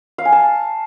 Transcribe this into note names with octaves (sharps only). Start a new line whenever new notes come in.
F5
G#5
A5